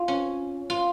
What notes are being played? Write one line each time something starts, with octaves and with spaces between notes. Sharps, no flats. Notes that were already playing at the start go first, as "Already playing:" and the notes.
Already playing: F4
C#4
F4